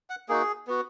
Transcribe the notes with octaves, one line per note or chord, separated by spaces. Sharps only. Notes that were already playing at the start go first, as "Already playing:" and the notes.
F#5
A#3 D#4 F#4 G#4
B3 F#4